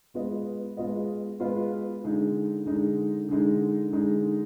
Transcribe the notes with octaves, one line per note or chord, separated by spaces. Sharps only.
G#3 B3 F4 B4 D#5
G#3 B3 F4 B4 D#5
G#3 B3 F4 B4 D#5
D3 G#3 D#4
D3 G#3 D#4
D3 G#3 D#4
D3 G#3 D#4